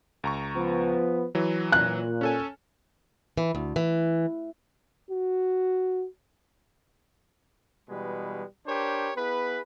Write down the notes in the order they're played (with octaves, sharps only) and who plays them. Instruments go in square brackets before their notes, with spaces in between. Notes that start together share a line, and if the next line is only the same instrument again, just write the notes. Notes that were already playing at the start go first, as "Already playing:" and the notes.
[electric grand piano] C#2 A#5 C#6
[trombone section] F3 B3
[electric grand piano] E3 F#3
[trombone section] A#2 [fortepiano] F#6
[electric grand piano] C#4 A4 G#5
[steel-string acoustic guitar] E3
D2
E3
[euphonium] F#4
[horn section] B2 E3 G3 G#3 B4
D4 G4 A#4 C5 C#5
B3 E4 G#4 B4